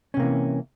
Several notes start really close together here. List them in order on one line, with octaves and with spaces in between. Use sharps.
C#4 C3 A#3 E3